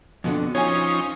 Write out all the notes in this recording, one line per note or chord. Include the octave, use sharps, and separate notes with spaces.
F2 B2 D3
F3 C#4 D#4 C#5 G#5